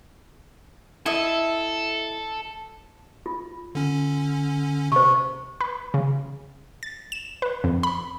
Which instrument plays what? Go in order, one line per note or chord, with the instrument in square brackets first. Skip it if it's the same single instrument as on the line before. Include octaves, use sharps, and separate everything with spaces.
[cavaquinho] E4 D#5 E5 [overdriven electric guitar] A4
[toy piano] F4
[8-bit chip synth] D3 C#4
[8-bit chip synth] C3 [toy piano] C5 C#6
[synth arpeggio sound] B4
C#3
A6
E7
B4
F2
B5